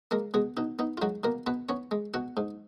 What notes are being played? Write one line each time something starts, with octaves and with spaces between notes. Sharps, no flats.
G#3 A#3 A#4
B2 G#3 G#4
B2 D#4
B3 D#4
F4
F#3 G#3 F#4
B2 A#3 A#4
B2 B3 B4
B3 C#4 C#5
G#3
B2 F#4 F#5
G#2